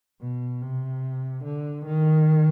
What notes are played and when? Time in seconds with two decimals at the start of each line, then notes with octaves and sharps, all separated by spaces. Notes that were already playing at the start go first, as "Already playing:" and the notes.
0.21 B2
0.61 C3
1.45 D3
1.86 D#3